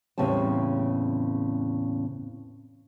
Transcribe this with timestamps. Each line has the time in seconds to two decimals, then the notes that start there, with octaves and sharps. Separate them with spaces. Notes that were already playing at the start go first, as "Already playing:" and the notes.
0.18 E2 A2 C#3 G3 C4 A5